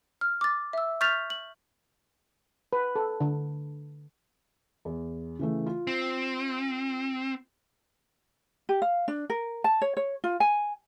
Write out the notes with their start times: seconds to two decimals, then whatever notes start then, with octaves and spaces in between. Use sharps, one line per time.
0.21 F6
0.41 D6 A6
0.73 E5 E6
1.01 C#6 F6 G6 A6 B6 F7
1.30 F#7
2.73 B4
2.96 A4
3.21 D3
4.85 E2
5.39 C#3 E3 A3
5.66 F4
5.87 C4
8.69 G4
8.82 F5
9.08 D4
9.30 A#4
9.64 A5
9.82 C#5
9.97 C#5
10.24 F4
10.40 G#5